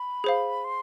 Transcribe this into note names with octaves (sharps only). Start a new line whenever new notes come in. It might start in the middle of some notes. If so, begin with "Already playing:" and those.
Already playing: B5
G#4 C5 F5
C6